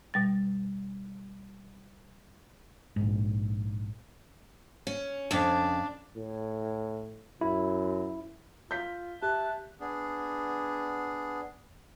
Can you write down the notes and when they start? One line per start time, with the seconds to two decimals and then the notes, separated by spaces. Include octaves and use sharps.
0.14 B2 G3 A6
2.96 A#1 G#2
4.87 C#4
5.31 F2 C#3 D4
6.17 A2
7.41 F#2 E4
8.71 F4 G6 B6
9.22 G4 E5 A5 F#6
9.80 B3 D4 G#4